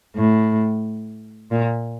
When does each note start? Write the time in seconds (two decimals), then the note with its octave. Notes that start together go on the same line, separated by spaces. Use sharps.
0.16 A2
1.51 A#2